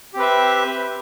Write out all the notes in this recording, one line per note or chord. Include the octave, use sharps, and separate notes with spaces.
C4 G4 B4 E5